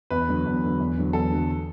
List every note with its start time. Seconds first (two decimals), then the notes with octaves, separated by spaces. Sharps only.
0.10 E2 B4
0.28 D3 F#3
0.45 E2
0.63 D3 F#3
0.79 E2
0.97 D3 F#3
1.13 E2 A4
1.31 D3 F#3